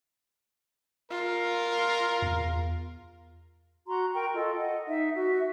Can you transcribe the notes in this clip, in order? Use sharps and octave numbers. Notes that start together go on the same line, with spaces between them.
F4 A#4
E2
F#4 A#5 C6
A#4 G5 A#5 C#6
F4 A4 D#5
D#5 F#5
D#4 E5
F#4 E5